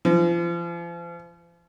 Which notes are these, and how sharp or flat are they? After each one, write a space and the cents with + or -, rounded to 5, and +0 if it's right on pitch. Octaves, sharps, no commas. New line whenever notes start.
F3 -40